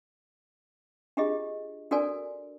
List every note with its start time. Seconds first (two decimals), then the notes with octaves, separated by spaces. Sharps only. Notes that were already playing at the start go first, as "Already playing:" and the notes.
1.17 D4 F4 G4 G#4 D#5
1.91 D4 F#4 A4 A#4 D5 G#5